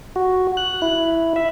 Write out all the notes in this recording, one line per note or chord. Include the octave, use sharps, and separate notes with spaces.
F#4
F#6
E4
E5